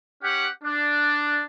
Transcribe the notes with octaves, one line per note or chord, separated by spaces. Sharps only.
C#4 G4 F#5
D4